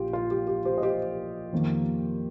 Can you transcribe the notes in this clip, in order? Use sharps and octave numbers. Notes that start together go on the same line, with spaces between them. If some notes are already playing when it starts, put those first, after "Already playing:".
Already playing: A#1 A#2 F4 G4
F4
G4
G4
G4 C5
D#5
G4 C5
F2 D#3 A#3